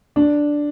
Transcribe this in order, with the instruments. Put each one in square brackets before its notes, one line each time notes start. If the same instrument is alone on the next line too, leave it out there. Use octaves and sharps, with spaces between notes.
[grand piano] D4